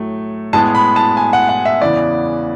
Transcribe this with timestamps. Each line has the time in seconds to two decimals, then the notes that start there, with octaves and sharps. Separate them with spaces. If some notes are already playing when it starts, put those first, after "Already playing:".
Already playing: A2 F#3 A3
0.53 A2 G#3 B3 A5
0.75 B5
0.96 A5
1.17 G#5
1.33 F#5
1.49 F#5
1.65 E5
1.82 E2 C#3 E3 B3 D5